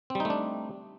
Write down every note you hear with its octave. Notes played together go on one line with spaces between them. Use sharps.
G3 A3 C4 D4 D#4